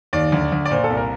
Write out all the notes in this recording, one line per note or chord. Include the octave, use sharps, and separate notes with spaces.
D#2 D5
D2
D2
D5
A#2 C5
A4
C2
A#4